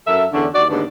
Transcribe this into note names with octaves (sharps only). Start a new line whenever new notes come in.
F#2 A4 A#4 E5
E2 D3 C#4 D4
D#2 F#4 D5
D#2 G#2 D3 B3 D4